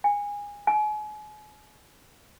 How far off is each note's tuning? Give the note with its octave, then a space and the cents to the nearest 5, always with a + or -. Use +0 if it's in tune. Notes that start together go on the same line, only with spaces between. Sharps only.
G#5 -20
G#5 +35